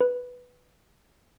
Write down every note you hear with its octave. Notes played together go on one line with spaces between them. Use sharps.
B4